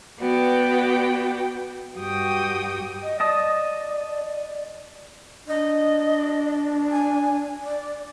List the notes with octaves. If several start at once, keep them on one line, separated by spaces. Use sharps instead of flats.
B3 F#4 D5 G5
G2 F#4 G4 G5 D#6
D#5
D5 D#5 A5 D#6
D4 D#5
G#5
D5